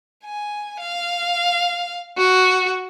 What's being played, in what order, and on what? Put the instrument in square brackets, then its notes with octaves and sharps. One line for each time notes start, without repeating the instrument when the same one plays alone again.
[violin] G#5
F5
F#4